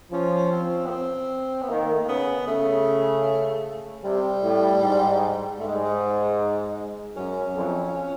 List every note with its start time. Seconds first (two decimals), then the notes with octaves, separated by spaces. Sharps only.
0.12 F3 C#4
0.51 C4
0.86 B3
0.90 C4
1.62 B3
1.69 D#3 A#3
1.92 A3
1.99 A#3
2.08 C#3 B3
2.47 C#3 A3
4.04 C3 G3
4.43 A2
4.82 G#2
5.59 G#2 A3
5.67 G#3
5.75 G3
5.83 G#3
7.16 F#2 C#4
7.55 F2